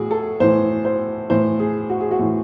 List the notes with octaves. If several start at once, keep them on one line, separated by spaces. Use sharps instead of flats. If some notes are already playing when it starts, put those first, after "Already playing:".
Already playing: A2 F#4 G#4
A4
A2 E3 C5
C5
A2 E3 C5
G#4
F#4
G#4
F#4
A2 E3